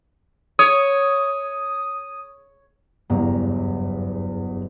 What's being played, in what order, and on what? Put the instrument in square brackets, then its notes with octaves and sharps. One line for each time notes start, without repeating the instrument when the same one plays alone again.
[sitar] C#5 [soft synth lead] D#6
[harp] F#1 G2 A#5 [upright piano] E2